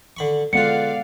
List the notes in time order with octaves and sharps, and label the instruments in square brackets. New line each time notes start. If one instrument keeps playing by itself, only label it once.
[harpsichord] D3 B5 C#6
[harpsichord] D3 F4 [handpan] G#3 B3 F#5 [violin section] D5 F5 [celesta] C#7